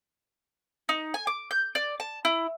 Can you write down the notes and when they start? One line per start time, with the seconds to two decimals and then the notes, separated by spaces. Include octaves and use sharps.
0.89 D#4
1.14 G#5
1.27 D6
1.51 G6
1.75 D5
2.00 A5
2.25 E4